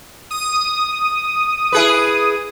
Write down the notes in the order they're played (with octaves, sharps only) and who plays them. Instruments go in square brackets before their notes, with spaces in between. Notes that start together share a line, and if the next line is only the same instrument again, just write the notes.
[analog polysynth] D#6
[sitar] E4 G#4 B4